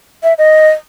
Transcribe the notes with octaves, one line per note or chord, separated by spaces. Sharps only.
E5
D#5